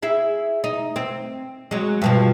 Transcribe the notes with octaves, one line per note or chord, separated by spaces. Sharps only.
E4 G#4 E5
D#4
C4
F#3 G#3
G2 B2 F3